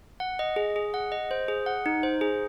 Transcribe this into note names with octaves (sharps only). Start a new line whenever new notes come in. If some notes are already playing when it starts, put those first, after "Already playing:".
F#5
D#5
G#4
G#4
F#5
D#5
C5
G#4
F#5
D#4
C5
G#4